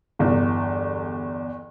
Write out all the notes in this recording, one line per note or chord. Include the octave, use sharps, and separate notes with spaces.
G1 E2